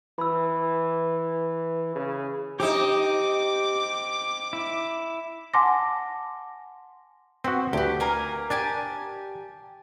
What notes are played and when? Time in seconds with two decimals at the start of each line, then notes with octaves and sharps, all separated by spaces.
0.18 E3 B5 E6
1.95 C#3
2.60 C4 D#4 G4 D6 D#6
4.53 E4
5.54 F#5 G#5 A5 C6 D6 A#6
7.44 B3 C4 F#4
7.73 D2 B3 G4
8.00 A#3 A#4 G#5
8.50 D4 G4 G#5 A5